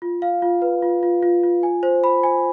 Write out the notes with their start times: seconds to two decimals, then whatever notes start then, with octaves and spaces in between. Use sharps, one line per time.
0.02 F4
0.22 F5
0.42 F4
0.62 B4
0.82 F4
1.03 F4
1.23 F4
1.43 F4
1.63 G#5
1.83 C5
2.04 B5
2.23 G#5